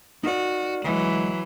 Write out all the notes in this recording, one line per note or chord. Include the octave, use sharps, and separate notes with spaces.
D#4 F#4 A#4 D5
D2 E3 F#3 G#3